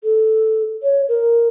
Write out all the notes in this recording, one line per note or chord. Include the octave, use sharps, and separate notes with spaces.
A4
C#5
A#4